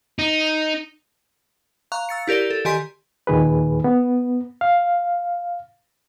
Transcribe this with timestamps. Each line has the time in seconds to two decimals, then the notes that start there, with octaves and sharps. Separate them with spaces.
0.19 D#4
1.92 F5 A#5 C#6 F#6
2.09 E6 A6 C#7
2.27 E4 G4 A#4 D5 G7
2.50 A4
2.65 D#3 G4 D#5 G#5 C6 B6
3.27 D#2 A#2 D#3 G#4 B4
3.84 B3
4.61 F5